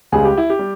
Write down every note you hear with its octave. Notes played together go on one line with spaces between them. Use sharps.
C#2 C#3 G3 G#4
G4
E4
G4
G3